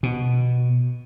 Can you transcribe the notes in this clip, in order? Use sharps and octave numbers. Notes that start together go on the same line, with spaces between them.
B2